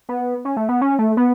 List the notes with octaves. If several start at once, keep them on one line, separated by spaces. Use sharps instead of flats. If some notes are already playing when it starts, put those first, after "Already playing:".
B3
C#4
A3
B3
C#4
A3
B3